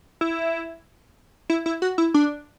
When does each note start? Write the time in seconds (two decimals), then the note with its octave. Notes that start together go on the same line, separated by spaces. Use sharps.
0.21 E4
1.50 E4
1.66 E4
1.82 F#4
1.98 E4
2.14 D4